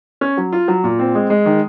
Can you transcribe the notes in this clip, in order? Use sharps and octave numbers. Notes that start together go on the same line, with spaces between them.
C#4
F#3
F4
F#3
A#2
C4
G#3
G#3
D#3